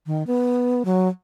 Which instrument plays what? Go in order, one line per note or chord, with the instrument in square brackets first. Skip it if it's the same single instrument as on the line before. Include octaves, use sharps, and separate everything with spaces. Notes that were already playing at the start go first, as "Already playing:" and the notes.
[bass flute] D#3
B3
F#3